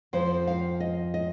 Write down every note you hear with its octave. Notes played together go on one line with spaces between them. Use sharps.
F2 F3 C5
F5
D#5
D#5